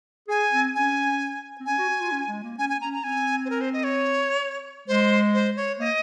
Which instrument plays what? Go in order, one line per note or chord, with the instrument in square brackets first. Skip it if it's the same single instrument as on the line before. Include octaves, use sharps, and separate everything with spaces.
[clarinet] G#4 [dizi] G#5
[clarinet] C4
[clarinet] C#4 [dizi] G#5
[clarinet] C4
[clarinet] C#4 [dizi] G#5
[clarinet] F#4
F#4
F4
C#4
G#3
A#3
[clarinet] C#4 [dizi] G#5
[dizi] G#5
[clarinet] C#4 [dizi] A#5
[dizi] A#5
[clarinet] C4 [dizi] G#5
[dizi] C5
A#4
C5
D#5
C#5
[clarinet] G#3 [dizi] C5
[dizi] C5
C#5
[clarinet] A#3 [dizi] D#5